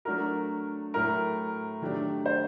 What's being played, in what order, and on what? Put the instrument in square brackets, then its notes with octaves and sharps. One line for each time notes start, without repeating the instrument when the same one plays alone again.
[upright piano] F#3 A3 D4 F#4 [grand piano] A#4
[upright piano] A2 F#3 A3 [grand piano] A#4
[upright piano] D#3 F#3 A3 D4 G4
[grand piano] C5